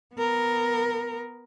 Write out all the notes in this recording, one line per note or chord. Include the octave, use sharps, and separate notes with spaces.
B3 A#4